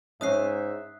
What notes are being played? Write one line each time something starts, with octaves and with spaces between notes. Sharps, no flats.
G#2 C#4 D#4 E5 D#6 F#6 C7